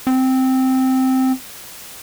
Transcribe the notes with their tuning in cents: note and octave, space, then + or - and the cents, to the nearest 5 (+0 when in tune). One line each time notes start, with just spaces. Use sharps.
C4 -5